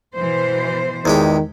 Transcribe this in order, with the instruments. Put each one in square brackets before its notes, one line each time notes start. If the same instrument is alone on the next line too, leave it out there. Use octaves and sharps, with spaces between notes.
[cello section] B2 E3 C5
[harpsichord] E2 G#3 G4 [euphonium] D#3